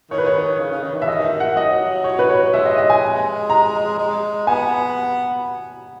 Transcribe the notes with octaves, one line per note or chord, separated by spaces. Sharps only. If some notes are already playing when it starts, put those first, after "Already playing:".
D#3 C#5
B4
C#5
C#3
C#3
D#3
E3
E5
D#3 D#5
E5
F#5
F#3 D#5
C#5
B4
C#5
G#3 E5
D#5
D#5
G#5
A#5
G#3
B3 G#5